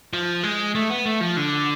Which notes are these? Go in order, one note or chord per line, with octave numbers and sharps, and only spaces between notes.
F3
G#3
A3
B3
A3
F3
D3